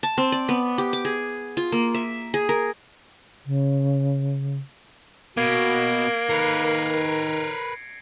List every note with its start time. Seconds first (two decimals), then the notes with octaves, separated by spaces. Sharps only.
0.03 A5
0.18 C4
0.32 D5
0.49 B3
0.78 G4
0.93 D6
1.05 G#4
1.57 F4
1.72 A#3
1.94 E5
2.34 G#4
2.49 A#4
3.46 C#3
5.37 B2 A#3 F#4 G#6 A#6 D7
6.29 D#3 A#4 B4 C7 C#7